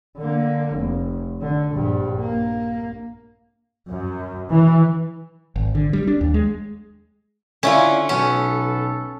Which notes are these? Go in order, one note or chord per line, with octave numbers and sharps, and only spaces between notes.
D3 A#3
F1
D3
A#1 G2
A#3
F#2
E3
G#1
D3
G3
D4
D#2
G#3
D3 C#4 E4 F4
B1 B3 C#4 A4